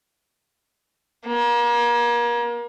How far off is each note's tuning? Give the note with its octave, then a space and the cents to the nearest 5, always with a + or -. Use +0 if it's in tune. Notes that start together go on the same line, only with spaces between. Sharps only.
A#3 +35